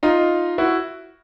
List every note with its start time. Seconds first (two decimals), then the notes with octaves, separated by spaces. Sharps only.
0.03 D#4 F4
0.58 E4 F#4